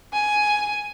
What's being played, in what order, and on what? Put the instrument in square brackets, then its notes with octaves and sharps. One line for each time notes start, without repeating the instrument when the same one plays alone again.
[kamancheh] G#5